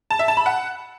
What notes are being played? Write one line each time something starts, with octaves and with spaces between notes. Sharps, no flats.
A5
E5
A5
B5
F#5